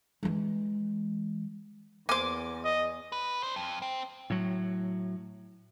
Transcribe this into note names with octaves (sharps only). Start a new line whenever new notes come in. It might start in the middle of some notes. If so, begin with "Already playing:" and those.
E3 G#3
E2 A#3 C5 G#5 D6
D#5
B4
D4 C5
F2
C4
A2 F#3